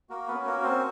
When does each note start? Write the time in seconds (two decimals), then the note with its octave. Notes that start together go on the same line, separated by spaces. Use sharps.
0.09 A#3 F#4 A#4
0.28 B3 B4
0.34 C#4
0.46 A#3 A#4
0.58 F#4
0.63 C4 C5